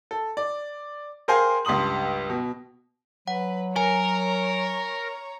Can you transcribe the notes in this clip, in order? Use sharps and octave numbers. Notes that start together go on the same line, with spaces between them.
A4
D5
G#4 A#4 C5 F5 G5 G#5
C#2 G2 C6 D#6 F#7
B2
F#3 B4 F#5
A#4 C#5 G#5 A#5